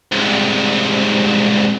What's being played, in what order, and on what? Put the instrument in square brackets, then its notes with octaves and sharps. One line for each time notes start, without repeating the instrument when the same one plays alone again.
[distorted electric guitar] C2 G#2